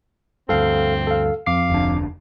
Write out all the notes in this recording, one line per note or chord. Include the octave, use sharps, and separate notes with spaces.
D2 G2 C4 A4 F5
A4 F5
F2 F5 D6 C7
F1 D2 D4